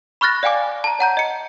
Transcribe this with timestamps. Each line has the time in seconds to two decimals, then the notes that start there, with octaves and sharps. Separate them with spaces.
0.21 B5 C#6 F6 F#6 A6 A#6
0.43 D5 F5 G5 G#5 D6
0.84 A5 A#5
0.99 C#5 F#5 A#5 G6
1.17 D#5 C#7